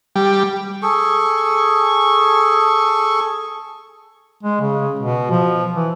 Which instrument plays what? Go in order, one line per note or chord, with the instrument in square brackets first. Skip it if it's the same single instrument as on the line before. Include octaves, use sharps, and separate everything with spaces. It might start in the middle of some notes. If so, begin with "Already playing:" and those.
[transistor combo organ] G3
[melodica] G#4 A4 C#6
[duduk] G#3
C#3
B2
F3
E3